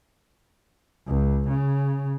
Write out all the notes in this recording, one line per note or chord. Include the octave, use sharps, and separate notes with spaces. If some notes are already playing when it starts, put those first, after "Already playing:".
C#2
C#3